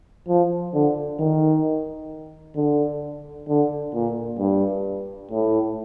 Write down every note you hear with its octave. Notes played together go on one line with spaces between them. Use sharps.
F3
D3
D#3
D3
D3
A#2
G2
A2